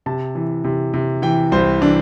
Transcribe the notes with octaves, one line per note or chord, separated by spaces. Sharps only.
C3 A5
E3
C3
C3
E3 G5
C2 C5
E3 D4